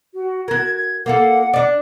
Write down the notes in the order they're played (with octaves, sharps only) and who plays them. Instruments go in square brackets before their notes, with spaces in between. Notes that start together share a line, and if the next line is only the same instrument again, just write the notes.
[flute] F#4
[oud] F#4 A#4 [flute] G#6
[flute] G#6
[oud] A#3 F4 A4 [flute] F#5
[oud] D4 D5